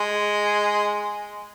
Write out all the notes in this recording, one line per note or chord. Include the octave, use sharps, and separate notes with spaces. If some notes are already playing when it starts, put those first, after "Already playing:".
Already playing: G#3